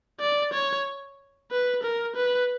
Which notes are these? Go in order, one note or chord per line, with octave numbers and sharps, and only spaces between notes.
D5
C#5
B4
A#4
B4